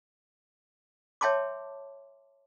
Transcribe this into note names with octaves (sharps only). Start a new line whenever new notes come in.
C#5 E5 G5 A5 C6 D6